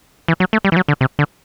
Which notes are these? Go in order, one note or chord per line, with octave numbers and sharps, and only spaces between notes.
E3
F#3
A3
G3
E3
F#3
D3
C3
D3